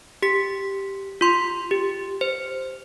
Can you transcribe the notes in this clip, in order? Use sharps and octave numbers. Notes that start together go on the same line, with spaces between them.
G4 B6
F4 C6
G4
C5